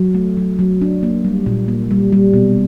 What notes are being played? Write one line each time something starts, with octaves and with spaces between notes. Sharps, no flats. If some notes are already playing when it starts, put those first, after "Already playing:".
Already playing: F#3
A3
F#3
F#3
D4
A#3
G3
A#2
A#3
G3
G3
B2